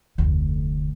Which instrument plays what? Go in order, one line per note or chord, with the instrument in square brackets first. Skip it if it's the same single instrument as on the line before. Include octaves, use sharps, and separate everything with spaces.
[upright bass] F1 D2